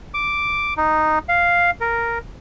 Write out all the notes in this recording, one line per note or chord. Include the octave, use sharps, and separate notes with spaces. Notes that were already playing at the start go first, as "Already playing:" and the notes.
D6
D#4
F5
A#4